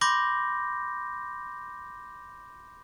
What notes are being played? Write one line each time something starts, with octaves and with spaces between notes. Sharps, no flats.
B5 C6 D6 G6 A#6